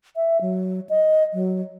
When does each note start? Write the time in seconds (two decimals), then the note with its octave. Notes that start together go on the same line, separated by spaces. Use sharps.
0.16 E5
0.41 F#3
0.89 D#5
1.33 F#3